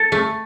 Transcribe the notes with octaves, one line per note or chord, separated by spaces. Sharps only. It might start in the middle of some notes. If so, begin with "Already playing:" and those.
Already playing: A4
A3